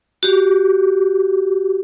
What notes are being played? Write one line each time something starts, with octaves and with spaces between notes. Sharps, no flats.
F#4 G4